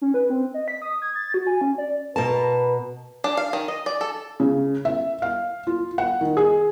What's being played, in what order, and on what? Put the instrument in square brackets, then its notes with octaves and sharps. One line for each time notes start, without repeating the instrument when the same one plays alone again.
[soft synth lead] C#4
B4
C4
D#5
B6
D#6
G#6
A6
F#4
G#5
C#4
D5
[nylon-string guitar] B2 A#4 A5 [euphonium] B4
[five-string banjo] D4
F5
D#3
D#5
D5
A4
[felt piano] C#3
E5
F5
F4
F#5
D#3
G#4